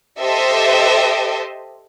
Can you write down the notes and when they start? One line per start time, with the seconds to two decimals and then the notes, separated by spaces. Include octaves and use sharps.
0.20 G4 A4 C5 D#5 E5